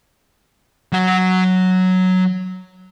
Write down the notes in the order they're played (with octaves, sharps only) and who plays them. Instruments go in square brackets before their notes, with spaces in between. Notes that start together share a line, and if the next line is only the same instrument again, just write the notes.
[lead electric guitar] F#3 F#5